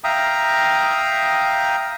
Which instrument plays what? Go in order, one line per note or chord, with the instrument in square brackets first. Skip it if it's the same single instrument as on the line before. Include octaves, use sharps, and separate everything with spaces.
[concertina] E5 F5 G5 A#5 D#6